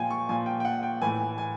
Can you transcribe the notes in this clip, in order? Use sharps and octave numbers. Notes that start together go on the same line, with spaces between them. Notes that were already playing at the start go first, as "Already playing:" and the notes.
Already playing: A#2 F3 G5 G#5
C#6
A#2 F3 G#5
G5
G5
F#5
G5
A2 E3 G#5
G#5